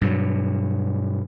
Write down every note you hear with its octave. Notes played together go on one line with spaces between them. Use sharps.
G2 B2 F#3